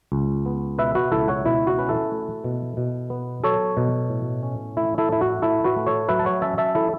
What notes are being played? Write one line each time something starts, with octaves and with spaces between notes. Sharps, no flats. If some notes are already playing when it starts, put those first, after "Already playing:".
C#2
B3
B2 B4 E5
F#4 B4
C#2 E4 A4
C#5 F#5
B2 E4
F#4
C#4 B4
E4 A4
A3
B2
B2
B3
F#3 A4 C#5
B2
A2
C#4
A3 E4
E4 A4
A2 E4
F#4
A2 E4 A4
F#4 B4
A3
A4 C#5
F#3 B4 E5
A5
C#5 F#5
C#4 E5 A5
E5 A5
E4 A4